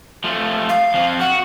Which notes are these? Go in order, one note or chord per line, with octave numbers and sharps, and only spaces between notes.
F3 A3
F5
F2 F3
F#4 F#5